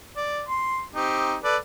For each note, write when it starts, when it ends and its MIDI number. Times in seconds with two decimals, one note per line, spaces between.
0.17 0.42 74
0.48 0.82 84
0.94 1.35 60
0.94 1.35 63
0.94 1.35 67
1.44 1.57 69
1.44 1.57 71
1.44 1.57 74